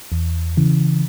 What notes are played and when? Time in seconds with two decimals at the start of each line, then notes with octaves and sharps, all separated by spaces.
0.12 E2
0.57 C#3 E3